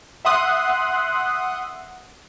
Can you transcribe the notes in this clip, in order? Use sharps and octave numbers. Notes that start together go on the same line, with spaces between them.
E5 F#5 C6 D#6 F#6